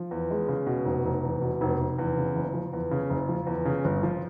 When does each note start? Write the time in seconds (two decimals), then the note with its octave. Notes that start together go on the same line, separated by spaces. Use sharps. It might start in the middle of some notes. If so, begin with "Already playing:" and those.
Already playing: F3
0.11 E2
0.30 G#3
0.48 C#3
0.67 B2
0.85 F1
1.05 F1
1.24 E2
1.41 B2
1.61 F1
1.79 F1
1.99 E2
2.17 C#3
2.35 F#1
2.54 F3
2.73 E2
2.91 C#3
3.10 F#1
3.29 F3
3.47 E2
3.65 C#3
3.84 G1
4.03 F3